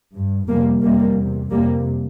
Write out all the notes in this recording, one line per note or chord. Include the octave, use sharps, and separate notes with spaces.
G2
F2 C3 G3 A#3
F2 C3 G3 A#3
E2 C3
F2 C3 G3 A#3